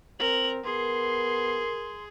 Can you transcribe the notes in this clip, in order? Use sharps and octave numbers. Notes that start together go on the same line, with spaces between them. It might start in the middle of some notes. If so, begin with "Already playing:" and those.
C4 A#4 F#7
B3 G#4 A#4 C6